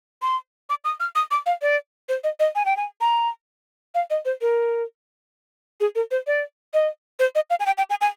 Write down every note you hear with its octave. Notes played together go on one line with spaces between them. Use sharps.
C6
D6
D#6
F6
D#6
D6
F5
D5
C5
D#5
D#5
G#5
G5
G#5
A#5
F5
D#5
C5
A#4
G#4
A#4
C5
D5
D#5
C5
D#5
F5
G#5
G5
G5
G#5
G#5